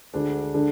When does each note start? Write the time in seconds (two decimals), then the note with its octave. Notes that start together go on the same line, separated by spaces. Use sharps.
0.14 D2 D3 G#3 D4
0.55 D3 G#3 D4